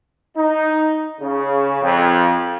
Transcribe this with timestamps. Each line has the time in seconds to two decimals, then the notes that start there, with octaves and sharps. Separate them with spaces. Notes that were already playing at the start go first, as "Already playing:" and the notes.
0.37 D#4
1.20 C#3
1.82 F2